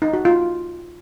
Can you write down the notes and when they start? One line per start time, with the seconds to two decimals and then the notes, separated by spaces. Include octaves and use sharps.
0.02 D#4
0.13 F#4
0.25 F4